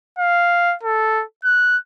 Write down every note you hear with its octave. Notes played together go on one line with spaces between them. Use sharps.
F5
A4
F#6